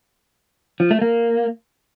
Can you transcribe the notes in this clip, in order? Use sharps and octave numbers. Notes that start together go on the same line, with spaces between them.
F3
A3
A#3